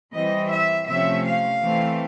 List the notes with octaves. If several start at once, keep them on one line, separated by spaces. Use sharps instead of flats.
E3 G3 C4 D#5
E5
C3 F3 A3 C#4 E5
F5
E3 A3 C4